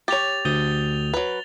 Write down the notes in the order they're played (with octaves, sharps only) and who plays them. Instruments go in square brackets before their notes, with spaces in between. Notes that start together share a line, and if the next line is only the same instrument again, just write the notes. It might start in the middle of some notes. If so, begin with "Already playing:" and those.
[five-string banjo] G4 C#5 [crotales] A6 F7
[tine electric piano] D2 D#6 G6 [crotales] A6 G7
[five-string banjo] F#3 B4